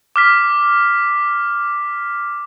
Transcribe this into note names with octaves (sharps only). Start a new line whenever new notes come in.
D6 F6 B6